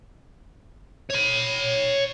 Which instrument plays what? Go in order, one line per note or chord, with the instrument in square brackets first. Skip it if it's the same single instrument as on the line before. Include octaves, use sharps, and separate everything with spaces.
[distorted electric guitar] C#5 B5